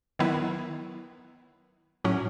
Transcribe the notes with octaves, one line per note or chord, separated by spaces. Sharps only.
D#3 F#3 B3 E4 B4
A2 F#3 C#4